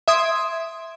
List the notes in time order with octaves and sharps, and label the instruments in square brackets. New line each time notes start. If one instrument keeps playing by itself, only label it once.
[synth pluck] E5 C6 D#6 G#6 D7